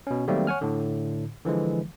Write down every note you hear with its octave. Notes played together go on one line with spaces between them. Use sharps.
B2 C#4
D#3 F#3 G3 A3 A#3 C4
C#5 F#5 G#5 F6
A2 D3
D3 E3 F3 G#3